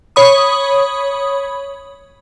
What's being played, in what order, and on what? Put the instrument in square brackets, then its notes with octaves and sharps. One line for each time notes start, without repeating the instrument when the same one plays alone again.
[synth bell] C#5 B5 D#6